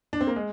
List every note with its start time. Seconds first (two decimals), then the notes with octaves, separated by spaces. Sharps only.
0.13 D4
0.21 C4
0.27 A#3
0.36 G#3